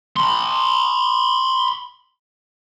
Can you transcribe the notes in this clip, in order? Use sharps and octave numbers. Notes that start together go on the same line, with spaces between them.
B5 C6